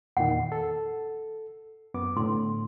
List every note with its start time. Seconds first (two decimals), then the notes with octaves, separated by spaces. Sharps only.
0.17 E2 A#2 D#3 F#5
0.52 A4
1.94 F#2 B3 D6
2.17 A2 D3 C6